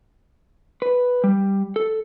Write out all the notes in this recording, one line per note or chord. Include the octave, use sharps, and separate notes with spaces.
B4
G3
A4